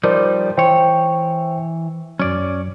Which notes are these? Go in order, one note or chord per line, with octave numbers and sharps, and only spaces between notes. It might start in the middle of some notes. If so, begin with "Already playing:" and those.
F3 G3 D#4 A#4 C5 D5
E3 C5 C#5 G5
F#2 F#3 C#4 D5